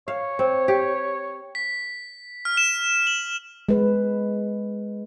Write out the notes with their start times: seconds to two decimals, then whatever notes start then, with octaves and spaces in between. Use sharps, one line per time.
0.08 C#5 F5
0.39 C4
0.68 G4
1.55 B6
2.45 F6
2.57 E7
3.07 F#7
3.69 G#3 B4